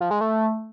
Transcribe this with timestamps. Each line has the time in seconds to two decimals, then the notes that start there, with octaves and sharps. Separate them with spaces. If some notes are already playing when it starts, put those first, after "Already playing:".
0.01 F3
0.11 G#3
0.21 A3